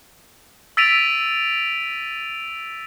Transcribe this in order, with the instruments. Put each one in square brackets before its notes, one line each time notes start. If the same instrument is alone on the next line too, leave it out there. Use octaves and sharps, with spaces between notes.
[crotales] E6 A6 B6 D7 D#7 F7